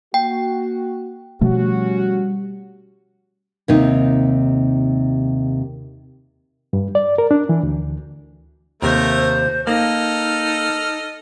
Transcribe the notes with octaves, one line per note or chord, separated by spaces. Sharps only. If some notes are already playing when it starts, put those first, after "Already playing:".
A#3 F#4 G5
B2 F3 G3 A3 C#4 F#4
D#2 C3 D#4
G2
D5
A#4
D4
E3
D2
D#2 C3 A3 A#4 C5
A#3 D#4 A4 D#5 F6